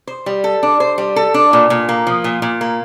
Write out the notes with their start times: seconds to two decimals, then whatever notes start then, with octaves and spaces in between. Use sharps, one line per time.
0.07 C5
0.26 G3
0.44 A4
0.63 D4
0.80 C5
0.98 G3
1.16 A4
1.34 D4
1.53 A#2
1.70 A#2
1.89 A#3
2.07 F3
2.24 A#2
2.42 A#2
2.61 A#3